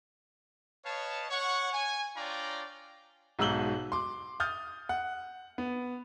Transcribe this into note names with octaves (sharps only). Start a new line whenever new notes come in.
B4 C#5 D#5 F5 A5
C#5 F#5 C#6
G#5
D4 F4 C#5 D5 G5 A#5
B1 G#2 F#4 E6 F#7 G7
C6 D6
D#6 F6 G6 A6
F#5
B3